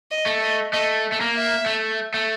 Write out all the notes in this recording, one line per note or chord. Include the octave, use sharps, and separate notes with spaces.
D#5
A3
D#5
A3 D#5
A3
A#3
E5
A3
A3